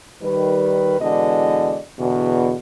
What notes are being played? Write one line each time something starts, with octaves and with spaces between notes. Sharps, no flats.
D#3 G3 B4
B2 D3 E3 G#3 D4 D#5
E2 B2 D3